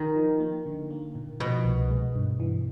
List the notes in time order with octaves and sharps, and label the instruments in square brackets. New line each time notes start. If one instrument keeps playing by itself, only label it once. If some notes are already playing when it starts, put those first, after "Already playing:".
Already playing: [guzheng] D#3 [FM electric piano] D#4
[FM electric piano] F3
A#3
D3
A#3
A#2
[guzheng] B2 [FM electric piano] F3
[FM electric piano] C2
G#3
G2
E3